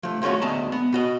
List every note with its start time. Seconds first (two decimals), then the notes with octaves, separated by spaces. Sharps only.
0.03 F3 A3
0.22 F3 G#3 A3 C#4 F#4
0.42 D2 G#3 B3 D#5 A5
0.72 B3
0.92 B2 F#4 D#5